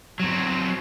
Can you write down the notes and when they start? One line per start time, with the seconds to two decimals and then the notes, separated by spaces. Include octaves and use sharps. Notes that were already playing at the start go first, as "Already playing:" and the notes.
0.20 F#3 C4